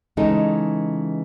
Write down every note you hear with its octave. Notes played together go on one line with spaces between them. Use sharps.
C#3 E3 G#3 D#4 A4